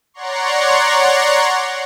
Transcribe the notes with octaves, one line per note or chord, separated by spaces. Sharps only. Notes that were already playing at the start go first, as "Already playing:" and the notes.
C#5 D5 F#5 A#5 C6 C#6